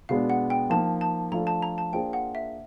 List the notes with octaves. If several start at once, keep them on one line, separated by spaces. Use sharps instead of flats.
B2 G#3 B3 D4 F5
F#5
G5
F3 A#3 D#4 A5
A5
F3 A3 D4 F4 A4 A#5
A5
A#5
A5
A#3 D4 F4 G#4 C5 G5
F#5
E5